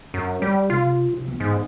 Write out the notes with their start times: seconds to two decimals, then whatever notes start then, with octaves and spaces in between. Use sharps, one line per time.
0.14 F#2
0.42 G3
0.70 C3 F4
1.11 C3
1.27 E3 B3
1.40 G#2